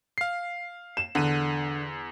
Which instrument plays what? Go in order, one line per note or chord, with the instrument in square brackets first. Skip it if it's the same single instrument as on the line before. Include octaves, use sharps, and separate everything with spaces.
[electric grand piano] F5 C7
[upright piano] E7
[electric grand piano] E2 D#7 [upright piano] D3